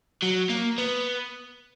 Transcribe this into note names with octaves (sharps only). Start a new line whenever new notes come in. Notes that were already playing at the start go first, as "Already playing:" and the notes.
F#3
A#3
B3